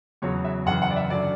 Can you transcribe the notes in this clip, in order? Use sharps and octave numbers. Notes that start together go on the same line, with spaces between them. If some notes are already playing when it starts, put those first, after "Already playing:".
E2 C#3 F#3 C#5
E5
F#2 C#3 E3 F#5
F#5
D5
E5
F#2 D3 F#3 D5